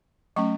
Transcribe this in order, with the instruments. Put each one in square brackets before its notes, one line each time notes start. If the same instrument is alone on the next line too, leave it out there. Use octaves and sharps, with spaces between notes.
[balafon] F#3 A3 C#4 C#6